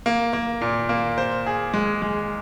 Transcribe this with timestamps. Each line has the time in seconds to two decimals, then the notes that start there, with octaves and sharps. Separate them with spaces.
0.06 A#3
0.33 A#3
0.61 A#2
0.89 A#3
1.18 C5
1.46 G#4
1.74 G#3
2.02 G#3